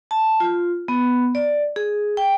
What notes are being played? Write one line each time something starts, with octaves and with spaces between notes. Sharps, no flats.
A5
F4
B3
D5
G#4
G5